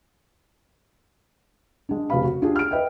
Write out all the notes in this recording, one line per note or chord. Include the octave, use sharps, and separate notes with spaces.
G#3 D4
F1 C#3 F#4 B4 F5 B5
F#4
D4 F4 G4 G#4
F6 D7
B4 D#5 E5 G5